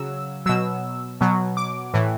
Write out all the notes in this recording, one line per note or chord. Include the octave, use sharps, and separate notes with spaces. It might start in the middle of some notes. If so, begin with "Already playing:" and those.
Already playing: C#3 F#3 E6
B2 F#3 E6
B2 F#3
D6
A2 E3